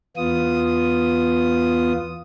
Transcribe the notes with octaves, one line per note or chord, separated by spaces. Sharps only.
E2 B3 F4 D#6